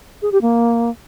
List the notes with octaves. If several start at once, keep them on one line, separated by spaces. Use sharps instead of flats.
G#4
G4
A#3